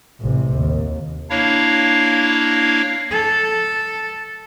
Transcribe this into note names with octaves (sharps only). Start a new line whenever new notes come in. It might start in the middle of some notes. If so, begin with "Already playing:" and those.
A1 C3
D#2
A#3 D4 E4 C#5 F5
A4